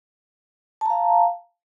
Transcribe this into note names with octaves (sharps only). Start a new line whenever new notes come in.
F5 A5 A#5